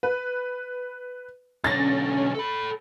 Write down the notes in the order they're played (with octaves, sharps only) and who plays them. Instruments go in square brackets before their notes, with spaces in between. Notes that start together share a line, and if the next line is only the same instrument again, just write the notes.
[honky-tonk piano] B4
[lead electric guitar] B1 D3 [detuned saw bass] C#4 [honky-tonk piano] A6 A#6
[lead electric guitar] A4 B5